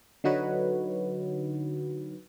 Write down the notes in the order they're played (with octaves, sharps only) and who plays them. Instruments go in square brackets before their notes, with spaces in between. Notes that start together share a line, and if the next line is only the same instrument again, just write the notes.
[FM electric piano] D3 F#3 D#4 F#4 B4 C#5